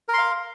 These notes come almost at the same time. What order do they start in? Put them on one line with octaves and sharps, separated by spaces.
A#4 C6 F5